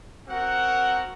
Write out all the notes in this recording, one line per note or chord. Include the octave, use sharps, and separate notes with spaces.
C4 F#4 A#4 F#5